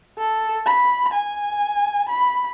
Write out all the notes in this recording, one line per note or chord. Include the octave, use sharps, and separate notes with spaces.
A4
B5
G#5
B5